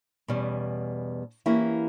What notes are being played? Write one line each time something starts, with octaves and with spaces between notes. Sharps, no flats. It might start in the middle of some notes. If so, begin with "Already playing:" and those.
E2 B2 G3 C#4
E3 A#3 C#4 E4 G4